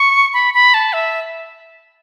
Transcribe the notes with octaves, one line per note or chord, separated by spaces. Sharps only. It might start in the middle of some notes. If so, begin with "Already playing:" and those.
Already playing: C#6
B5
B5
A5
E5